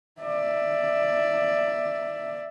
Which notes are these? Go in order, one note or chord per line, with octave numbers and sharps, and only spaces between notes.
D5 E5